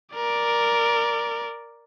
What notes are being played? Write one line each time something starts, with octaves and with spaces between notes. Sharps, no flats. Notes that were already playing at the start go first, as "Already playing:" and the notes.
A#4 D5